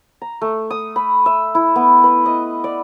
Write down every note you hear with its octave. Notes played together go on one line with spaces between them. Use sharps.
A#5
A3
D#6
B5
E5
E4
B3
B4
D#5
D5